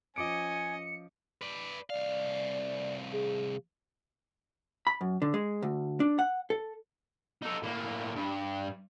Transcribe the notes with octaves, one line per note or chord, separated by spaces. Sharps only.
F3 C#4 D#5 G#5 D6 C#7 D7
B4 D5
C2 D5 F5
G#4
B5
F#2
D3
G#3
D2
D4
F#5
A4
D#4 A4
A2 A#3
G2